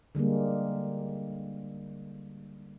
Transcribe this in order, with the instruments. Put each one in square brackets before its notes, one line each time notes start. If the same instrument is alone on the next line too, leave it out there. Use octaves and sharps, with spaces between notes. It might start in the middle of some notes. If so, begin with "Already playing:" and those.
[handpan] D3 G3 G#3 A#3